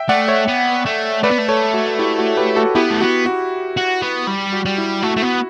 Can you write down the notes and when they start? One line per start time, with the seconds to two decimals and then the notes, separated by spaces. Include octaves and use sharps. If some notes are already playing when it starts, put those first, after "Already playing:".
Already playing: E5 G5
0.09 A3 D5 F#5
0.28 C#5 E5
0.48 B3
0.85 A3
1.23 A3 B4 D5
1.31 B3
1.38 A3
1.48 A4 C#5
1.74 F#4
1.99 E4 G4
2.18 F#4 A4
2.37 G4 B4
2.56 F#4 A4
2.75 B3 E4 G4
2.90 A3
3.00 B3 F#4
3.26 F#4
3.77 F#4
4.02 B3
4.27 G3
4.53 F#4
4.65 G3
4.78 E4
5.03 A3 F#4
5.17 A3
5.22 B3